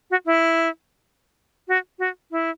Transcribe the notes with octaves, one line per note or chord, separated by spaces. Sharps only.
F#4
E4
F#4
F#4
E4